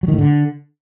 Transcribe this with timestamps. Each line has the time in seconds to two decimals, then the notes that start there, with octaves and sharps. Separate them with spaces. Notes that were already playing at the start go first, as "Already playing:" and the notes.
0.03 F#3
0.08 D#3
0.13 A2
0.18 D3